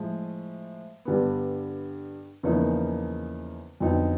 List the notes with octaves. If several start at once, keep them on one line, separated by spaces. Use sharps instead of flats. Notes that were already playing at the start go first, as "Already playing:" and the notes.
Already playing: A2 F3 G#3
G2 D3 G3 B3
E2 C#3 F3 A#3 D#4
F2 D3 F#3 B3 D#4